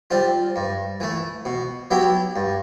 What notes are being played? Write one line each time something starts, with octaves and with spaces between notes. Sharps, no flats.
G3 C4 F4
G2
E3 A3
B2
F#3 B3 E4 G4
G2